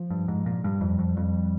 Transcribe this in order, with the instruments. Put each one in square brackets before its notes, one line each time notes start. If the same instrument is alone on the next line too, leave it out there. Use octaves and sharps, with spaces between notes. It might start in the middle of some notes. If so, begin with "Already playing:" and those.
Already playing: [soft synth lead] F3
[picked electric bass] G2
G#2
A#2
[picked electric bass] G2 [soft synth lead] G3
[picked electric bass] F2
F2
F2